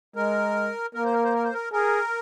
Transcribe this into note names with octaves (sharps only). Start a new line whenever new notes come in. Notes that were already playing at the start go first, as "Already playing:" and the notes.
G#3 A#4
A#3 A#4
C5
A#4
C5
A#4
C5
A#4
G#4 A#4